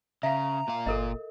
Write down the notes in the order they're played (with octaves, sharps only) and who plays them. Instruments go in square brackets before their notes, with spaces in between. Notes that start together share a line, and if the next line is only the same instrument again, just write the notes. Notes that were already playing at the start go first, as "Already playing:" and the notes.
[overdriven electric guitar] C#3 [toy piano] E5 F5 [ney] A#5
[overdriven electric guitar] A#2 F5
[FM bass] G1 [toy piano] A4 A#4 D#5